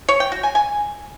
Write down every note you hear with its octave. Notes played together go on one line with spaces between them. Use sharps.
C#5
G5
F#4
G#5
G#5